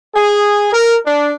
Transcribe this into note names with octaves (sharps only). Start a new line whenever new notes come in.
G#4
A#4
D4